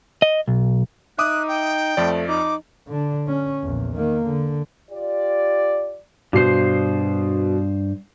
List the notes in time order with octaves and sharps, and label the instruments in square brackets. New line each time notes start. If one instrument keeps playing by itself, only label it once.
[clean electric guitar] D#5
B1
[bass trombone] D#4 [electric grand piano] E5 D6 D#6 [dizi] F#6
[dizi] G5
[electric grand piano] F2 F3 D5 [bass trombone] A3
[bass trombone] D#4 [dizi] D6
[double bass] D3 D4
C#4
A#1 E2
D#3 A#3
D3
[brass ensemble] F4 G4 D5
[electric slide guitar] G2 C5 [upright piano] B2 C7